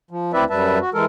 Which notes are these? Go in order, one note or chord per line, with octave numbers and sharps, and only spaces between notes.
F3
D2 C4 E4 B4 D5 E5
F#2 G3 B4 E5 A5
F#4
E3 G#3 A4 A#4